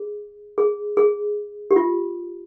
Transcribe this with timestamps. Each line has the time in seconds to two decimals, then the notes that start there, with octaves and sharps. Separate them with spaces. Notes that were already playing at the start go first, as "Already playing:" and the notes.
Already playing: G#4
0.58 G#4
0.97 G#4
1.71 G4
1.76 F4